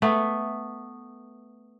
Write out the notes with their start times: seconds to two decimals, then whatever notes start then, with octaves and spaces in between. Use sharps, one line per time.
0.02 A3 B3